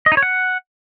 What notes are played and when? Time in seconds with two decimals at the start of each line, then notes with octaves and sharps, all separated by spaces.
0.06 D#5
0.12 D#4
0.17 C#5
0.23 F#5